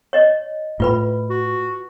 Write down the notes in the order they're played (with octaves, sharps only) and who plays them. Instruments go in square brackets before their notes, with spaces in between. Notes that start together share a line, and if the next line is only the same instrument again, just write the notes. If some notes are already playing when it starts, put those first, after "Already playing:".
[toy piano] C#5 D#5
[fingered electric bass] A2 [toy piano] F4 B4 B5
[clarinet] F#4